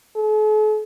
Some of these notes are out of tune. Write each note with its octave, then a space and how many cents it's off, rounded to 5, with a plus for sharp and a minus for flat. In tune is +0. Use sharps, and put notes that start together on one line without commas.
A4 -45